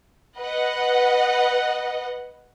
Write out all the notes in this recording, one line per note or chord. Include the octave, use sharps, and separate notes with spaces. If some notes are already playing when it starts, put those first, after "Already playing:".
B4 D#5 F#5